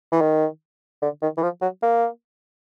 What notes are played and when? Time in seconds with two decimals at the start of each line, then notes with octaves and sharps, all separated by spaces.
0.12 E3
0.21 D#3
1.02 D3
1.22 D#3
1.37 E3
1.43 F3
1.61 F#3
1.83 A#3